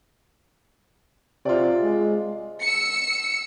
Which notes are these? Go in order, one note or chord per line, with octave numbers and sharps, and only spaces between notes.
C3 F4 D5
G#3
E6 C#7